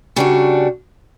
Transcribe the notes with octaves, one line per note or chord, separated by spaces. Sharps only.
C#3 G3 D4 F#4